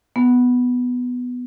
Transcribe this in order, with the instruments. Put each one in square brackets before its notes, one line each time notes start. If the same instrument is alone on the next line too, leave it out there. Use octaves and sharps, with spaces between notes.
[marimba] B3